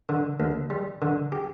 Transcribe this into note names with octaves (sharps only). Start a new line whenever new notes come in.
D3
D2
G3
D3
G4